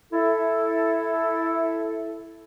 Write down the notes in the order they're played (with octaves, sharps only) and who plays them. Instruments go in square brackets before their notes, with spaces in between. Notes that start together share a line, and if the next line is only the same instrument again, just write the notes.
[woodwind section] E4 A4